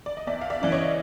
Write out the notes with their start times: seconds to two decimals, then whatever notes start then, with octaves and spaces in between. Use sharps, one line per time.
0.06 D5
0.17 D#5
0.27 E2 D5 E5
0.41 F5
0.50 D5 E5
0.62 C#3 E3 D5
0.72 C#5 D#5